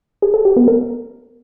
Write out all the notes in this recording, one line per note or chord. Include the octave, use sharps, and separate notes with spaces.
G#4
A4
G4
B3
A#4